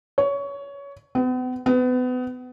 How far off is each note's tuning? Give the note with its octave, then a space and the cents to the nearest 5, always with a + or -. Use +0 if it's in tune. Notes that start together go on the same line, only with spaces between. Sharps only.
C#5 +20
B3 +40
B3 +30